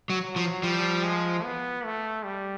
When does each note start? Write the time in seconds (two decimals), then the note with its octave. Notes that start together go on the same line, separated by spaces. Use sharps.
0.10 F#3
0.24 F#3
0.36 F3
0.63 F3 G3
1.04 G#3
1.44 B3
1.85 A3
2.25 G3